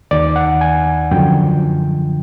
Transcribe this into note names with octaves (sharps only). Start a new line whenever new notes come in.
D#2 D#3 D5
F#5
G#5
F#2 D3 F3 G5